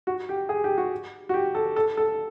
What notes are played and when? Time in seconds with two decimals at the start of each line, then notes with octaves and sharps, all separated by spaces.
0.07 F#4
0.29 G4
0.49 G#4
0.64 G4
0.77 F#4
1.29 F#4
1.34 G4
1.55 A4
1.76 A4
1.97 A4